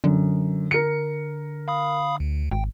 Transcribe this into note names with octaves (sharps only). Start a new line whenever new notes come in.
F#2 D3
A#4 C#7
F5 B5 D#6
D2
G#1 G5